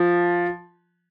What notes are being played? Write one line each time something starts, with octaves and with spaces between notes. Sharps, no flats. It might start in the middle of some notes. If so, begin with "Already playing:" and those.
Already playing: F3